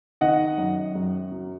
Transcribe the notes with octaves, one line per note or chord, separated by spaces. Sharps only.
D#3 D#5 F#5
F#2
F#2
F#3